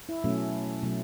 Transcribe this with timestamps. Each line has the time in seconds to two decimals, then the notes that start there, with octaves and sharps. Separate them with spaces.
0.09 E4
0.24 B2 F#3 A3 C#4
0.83 B2 F#3 A3